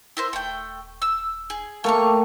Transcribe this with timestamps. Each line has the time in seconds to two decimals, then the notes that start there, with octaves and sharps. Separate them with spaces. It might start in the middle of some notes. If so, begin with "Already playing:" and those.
0.17 E4 A#4 C5
0.33 D#1 A3 G5
1.02 E6
1.50 G#4
1.84 A3 A#3 G4 C#5 F5 C#6